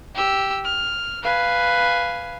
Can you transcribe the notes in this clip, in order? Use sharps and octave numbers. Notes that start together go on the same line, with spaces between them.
G4 E6
F6
B4 F5 G#5